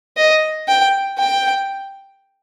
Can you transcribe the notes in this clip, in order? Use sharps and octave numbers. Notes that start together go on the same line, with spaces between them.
D#5
G5
G5